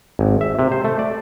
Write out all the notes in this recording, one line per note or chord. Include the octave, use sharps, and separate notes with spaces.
G#1
E5
C3
C5
A3
D5